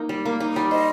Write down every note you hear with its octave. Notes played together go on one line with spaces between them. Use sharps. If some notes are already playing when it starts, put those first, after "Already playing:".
Already playing: A#3 D#4
G3
A#3
D#4
G3
C5 D#5